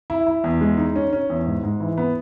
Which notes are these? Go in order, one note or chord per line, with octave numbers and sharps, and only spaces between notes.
E4
E4
E2
G#3
D#4
C#4
C#4
E2
G#2
G#2
E3
B3